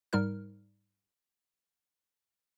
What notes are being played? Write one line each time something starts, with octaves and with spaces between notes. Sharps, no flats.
G#2 G3 D#4 A#4 F6